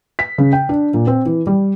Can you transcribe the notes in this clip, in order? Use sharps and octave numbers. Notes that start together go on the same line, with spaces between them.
B6
C#3
G5
D4
A#2
C4
E3
G3